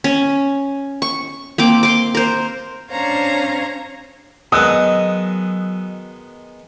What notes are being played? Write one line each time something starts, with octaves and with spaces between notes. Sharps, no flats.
C#4
C#6
A#3 C4 D6
C6 D6
A#4 C5
C#4 D4 C5 C#5 F5 A#5
D#3 F#3 G#3 B3 D#5 D#6 E6 F#6